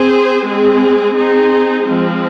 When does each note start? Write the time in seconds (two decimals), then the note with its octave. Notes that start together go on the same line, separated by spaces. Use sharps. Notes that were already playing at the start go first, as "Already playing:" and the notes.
Already playing: C4 G#4 C5
0.47 G#3 C4 G#4
1.16 C4 D#4 G#4 C5
1.84 F3 G#3 C4